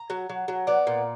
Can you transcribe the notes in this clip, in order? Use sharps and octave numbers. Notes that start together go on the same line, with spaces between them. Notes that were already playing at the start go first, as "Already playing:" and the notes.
Already playing: A#5
F#3
F#3
F#3
B3 D5
A#2